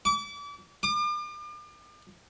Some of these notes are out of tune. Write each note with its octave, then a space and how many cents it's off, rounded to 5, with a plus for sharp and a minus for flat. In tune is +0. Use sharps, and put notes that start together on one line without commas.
D6 -35
D6 +40